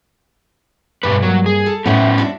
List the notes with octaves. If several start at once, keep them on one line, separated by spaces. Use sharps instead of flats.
G2 B2 G3 B4
F#3 A#3
G#4
A4
A2 F#3 B3 C#4 E5
D4 F#4 E5